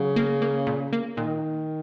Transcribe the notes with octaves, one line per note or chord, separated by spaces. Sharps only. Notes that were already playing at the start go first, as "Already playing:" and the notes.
Already playing: C#3 F#3
A#3
A#3
A#2
A#3
A#2 D#3